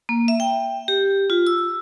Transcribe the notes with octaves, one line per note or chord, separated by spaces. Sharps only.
A#3
E5
G5
G4
F4
E6